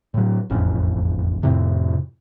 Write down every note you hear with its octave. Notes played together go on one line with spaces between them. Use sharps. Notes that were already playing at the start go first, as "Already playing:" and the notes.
A2 F#3
E1 A1 F2 C#4
F2 A2 C3